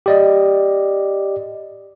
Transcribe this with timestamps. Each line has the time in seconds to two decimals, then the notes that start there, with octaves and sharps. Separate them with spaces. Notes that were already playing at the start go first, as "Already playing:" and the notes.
0.06 G4 D5 D#5